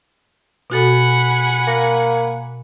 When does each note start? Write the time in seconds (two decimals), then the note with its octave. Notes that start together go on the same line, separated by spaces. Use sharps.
0.70 B2 F#4 A4 F#5 G#5 B5
1.67 A#3 A#6